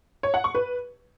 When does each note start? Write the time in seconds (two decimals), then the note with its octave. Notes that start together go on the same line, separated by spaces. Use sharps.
0.23 C#5
0.34 F#5
0.44 C#6
0.55 B4